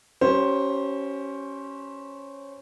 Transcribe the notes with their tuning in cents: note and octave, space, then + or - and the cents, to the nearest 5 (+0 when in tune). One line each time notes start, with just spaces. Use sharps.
G3 -35 C#4 +0 C5 +10